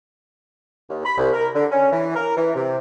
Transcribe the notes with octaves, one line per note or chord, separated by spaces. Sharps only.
D#2
B5
C2
A#4
D3
C#4
E3
A#4
E3
C3